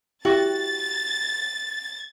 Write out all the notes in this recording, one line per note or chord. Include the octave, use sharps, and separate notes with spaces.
E4 F#4 G4 A6